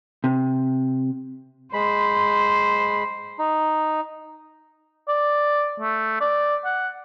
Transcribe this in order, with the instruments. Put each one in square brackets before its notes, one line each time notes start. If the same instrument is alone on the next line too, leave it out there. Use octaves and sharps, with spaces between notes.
[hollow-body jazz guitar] C3
[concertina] G#3 B5 [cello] C5
[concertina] D#4
[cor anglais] D5
A3
D5
F#5